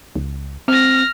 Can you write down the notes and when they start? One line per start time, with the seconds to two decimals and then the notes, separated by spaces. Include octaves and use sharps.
0.16 C#2
0.68 C4 F6 A#6